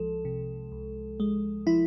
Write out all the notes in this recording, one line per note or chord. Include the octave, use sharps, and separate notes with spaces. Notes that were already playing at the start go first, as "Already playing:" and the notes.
Already playing: C2 F3 G#3 A4
C3
C2
G#3
F3 E4